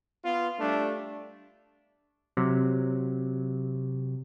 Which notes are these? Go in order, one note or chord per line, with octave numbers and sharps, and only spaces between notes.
B3 F4
G3 A3 D4
C3 F#3